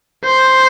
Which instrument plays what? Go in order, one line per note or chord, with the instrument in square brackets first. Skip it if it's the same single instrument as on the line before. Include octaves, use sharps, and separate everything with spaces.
[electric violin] C5